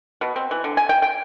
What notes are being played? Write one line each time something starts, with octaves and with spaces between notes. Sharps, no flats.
B2
C4
E3
D3
G#5
G5
G5